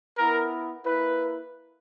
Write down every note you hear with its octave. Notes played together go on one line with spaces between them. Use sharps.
B3 E4 A#4
A#3 E4 B4